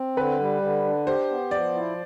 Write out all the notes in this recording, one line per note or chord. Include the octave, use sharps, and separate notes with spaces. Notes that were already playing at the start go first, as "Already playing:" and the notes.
Already playing: C4
D3 B4
G3
D3
D4
G4 C5
B3
F3 D5
E4